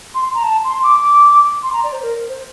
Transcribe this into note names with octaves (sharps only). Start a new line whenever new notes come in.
C6
A#5
A5
C6
D6
C6
A#5
D5
C5
A#4
C5